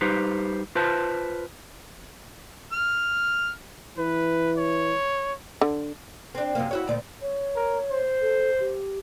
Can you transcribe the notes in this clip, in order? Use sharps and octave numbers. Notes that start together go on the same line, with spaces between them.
G3 D#4 G4 B4 C5
F4 B4 C5 A5
F6
E3 B4
C#5
D3
C4 D4
F#2 C3 A#3
E4 F#4 C#5
D2 A#2 D5
C#5
A#4
C5
A4
G4